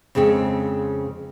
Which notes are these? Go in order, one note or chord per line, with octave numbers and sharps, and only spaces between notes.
F2 C#3 G#3 C4